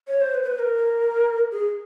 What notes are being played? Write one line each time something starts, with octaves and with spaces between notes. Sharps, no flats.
C#5
C5
B4
C5
B4
A#4
G#4